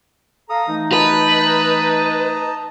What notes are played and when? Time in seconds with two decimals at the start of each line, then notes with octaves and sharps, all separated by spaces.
0.50 A4 F5 A#5 D#6
0.68 E3 A3 D#4
0.92 B4 D#5 A5 A#5